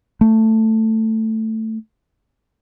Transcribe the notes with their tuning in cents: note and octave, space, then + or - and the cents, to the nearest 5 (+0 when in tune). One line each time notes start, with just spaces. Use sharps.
A3 +10